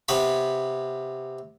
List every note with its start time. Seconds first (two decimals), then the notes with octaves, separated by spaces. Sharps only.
0.08 C3 B3 C#5 B5